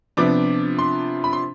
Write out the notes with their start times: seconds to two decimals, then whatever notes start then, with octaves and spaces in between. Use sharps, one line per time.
0.17 C3 F3 B3 D4 D6
0.78 C6
1.24 B5
1.33 C6